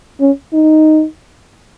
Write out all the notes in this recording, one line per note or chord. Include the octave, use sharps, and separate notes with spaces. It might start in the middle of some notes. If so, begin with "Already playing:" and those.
C#4
D#4